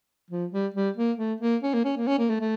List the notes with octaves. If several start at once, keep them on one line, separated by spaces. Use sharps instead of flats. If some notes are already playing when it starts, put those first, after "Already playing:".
F3
G3
G3
A#3
A3
A#3
C#4
A#3
C#4
A#3
C#4
A#3
A3
A3